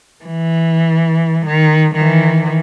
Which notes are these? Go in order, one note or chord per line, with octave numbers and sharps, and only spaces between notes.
E3
D#3
D#3 E3